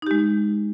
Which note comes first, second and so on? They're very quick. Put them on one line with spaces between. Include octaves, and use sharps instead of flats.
D#4 G4 G#3